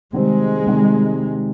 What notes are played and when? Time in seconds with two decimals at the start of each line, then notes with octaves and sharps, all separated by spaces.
0.13 C3 D#3 G3 G#3 C4
0.66 C3 D#3 G3